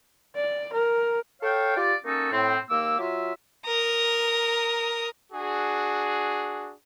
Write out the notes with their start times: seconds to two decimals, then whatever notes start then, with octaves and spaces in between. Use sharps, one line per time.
0.36 D5
0.73 A#4
1.42 A4 C#5 F5 G5
1.76 F4 G4 D5
2.04 A#3 C#4 D#4 F#4 A4
2.31 A2 C4
2.69 D#2 A#3 D6 E6
2.99 F#3 F4 E5
3.65 A#4 D#6
5.33 D4 F#4 G#4